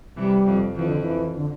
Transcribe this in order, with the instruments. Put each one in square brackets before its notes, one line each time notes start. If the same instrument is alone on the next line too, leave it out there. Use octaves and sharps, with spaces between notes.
[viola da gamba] C3 E3 [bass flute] G3
[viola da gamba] F2
[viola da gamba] F2 [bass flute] E3
[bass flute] D3
E3
D3